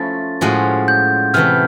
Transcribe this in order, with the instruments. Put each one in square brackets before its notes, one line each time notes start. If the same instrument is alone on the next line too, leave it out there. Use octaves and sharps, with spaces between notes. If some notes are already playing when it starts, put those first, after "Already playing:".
Already playing: [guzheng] F3 A3 C#4 E4 [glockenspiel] A6
[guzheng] A2 F3 G#3 C#4 F#4
[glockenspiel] G6
[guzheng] C3 E3 A3 [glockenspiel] F6